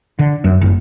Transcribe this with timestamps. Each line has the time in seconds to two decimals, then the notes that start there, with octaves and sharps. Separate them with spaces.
0.19 D3
0.44 F#2
0.61 F#1